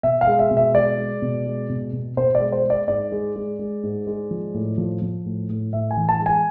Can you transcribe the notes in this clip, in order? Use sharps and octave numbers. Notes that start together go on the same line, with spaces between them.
B2 E5
F5
G#3
E5
B2
E5
G#3 D5
G#3
B2
G#3
B2
B2
B2 C5
D5
G#3
C5
G#3
D5
G#2 D5
G#3
G#3
G#3
G#2
G#3
F3
A2
F3
F3
A2
A2
A2 E5
G#5
E3
A5
G#3
G#5